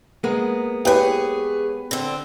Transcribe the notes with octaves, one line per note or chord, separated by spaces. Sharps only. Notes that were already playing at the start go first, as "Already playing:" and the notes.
G#3 A#3 B3
G4 G#4 B4 C#5
D3 C4